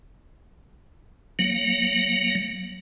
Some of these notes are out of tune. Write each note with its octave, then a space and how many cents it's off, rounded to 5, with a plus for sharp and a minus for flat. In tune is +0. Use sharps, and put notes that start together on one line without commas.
F#3 +0 A#3 +10